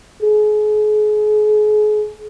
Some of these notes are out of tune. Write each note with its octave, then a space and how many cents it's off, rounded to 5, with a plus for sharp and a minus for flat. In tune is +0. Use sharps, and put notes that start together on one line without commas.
G#4 +35